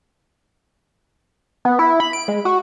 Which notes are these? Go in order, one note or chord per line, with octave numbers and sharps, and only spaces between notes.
B3
E4
B5
D7
G#3
F#4